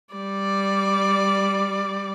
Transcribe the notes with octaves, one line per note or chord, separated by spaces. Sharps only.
G3 D5